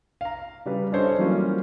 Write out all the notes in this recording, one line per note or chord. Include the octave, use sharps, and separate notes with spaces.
F5 A#5
C#3 G3 B4
C#4 D4 A4 C5 C#5 D#5
E3 F#3 G3 A#3 C#4 F4